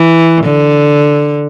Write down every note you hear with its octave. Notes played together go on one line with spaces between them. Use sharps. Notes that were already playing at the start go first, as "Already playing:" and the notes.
Already playing: E3
D3